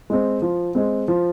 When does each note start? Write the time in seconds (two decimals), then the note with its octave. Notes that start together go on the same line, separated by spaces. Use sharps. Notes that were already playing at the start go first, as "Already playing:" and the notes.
0.10 G#3 C4
0.42 F3
0.75 G#3 C4
1.08 F3